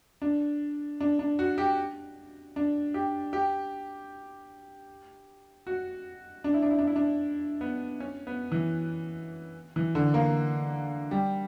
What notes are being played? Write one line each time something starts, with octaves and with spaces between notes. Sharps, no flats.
D4
D4
D4
F#4
G4
D4
G4
G4
F#4
D4
E4
D4
E4
D4
E4
D4
B3
C#4
B3
E3
E3
D3
A#3
G3